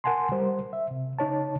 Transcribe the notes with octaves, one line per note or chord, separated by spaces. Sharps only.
A#4 F#5 G#5 A5 C6
G3 A#4 C5
E5
C3
C#3 D#4 C#5 A5